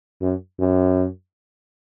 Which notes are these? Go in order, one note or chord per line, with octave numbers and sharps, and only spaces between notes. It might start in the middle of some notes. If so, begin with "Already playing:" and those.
F#2
F#2